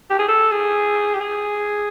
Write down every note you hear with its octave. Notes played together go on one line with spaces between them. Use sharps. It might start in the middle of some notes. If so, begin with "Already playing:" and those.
G4
G#4
A4
G#4
G4
G#4